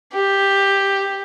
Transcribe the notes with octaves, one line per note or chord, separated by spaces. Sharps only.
G4